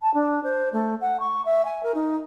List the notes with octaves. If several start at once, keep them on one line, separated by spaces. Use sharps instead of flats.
A5
D4
C5
A3
F#5
C#6
E5
G#5
A#4
D#4